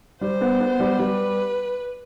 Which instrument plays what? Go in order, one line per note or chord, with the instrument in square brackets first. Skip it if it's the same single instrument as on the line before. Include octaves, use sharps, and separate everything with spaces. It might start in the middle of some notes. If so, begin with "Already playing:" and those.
[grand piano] G3 [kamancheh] C5
[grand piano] B3
B3
G3
[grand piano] G3 [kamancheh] B4